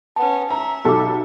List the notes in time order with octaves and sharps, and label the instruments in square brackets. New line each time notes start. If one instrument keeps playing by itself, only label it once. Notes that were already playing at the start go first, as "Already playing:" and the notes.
[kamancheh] B3 C#4 [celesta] A5
[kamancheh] C#4 E5 [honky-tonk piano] A#5
[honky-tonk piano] B1 A4 [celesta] G4 A5 D6